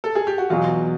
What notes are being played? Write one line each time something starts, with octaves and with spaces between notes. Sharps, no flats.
A4
G#4
G4
F#4
E2 B2 F#3 F4